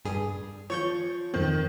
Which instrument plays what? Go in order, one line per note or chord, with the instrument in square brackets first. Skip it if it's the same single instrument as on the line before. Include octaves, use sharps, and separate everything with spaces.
[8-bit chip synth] G2 G#4
[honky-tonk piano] F3 [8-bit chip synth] C#5 C#6 G6
[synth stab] F2 C4 [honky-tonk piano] D#3